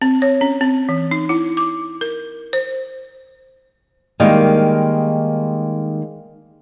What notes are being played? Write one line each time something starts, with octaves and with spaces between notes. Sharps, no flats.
C4
C#5
C#4
C4
E3
D#4
E4
D6
A#4
C5
D#3 G3 G#3 A#3